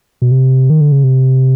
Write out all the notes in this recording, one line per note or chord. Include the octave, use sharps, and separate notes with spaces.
B2
C3
D#3
D3
C#3
C3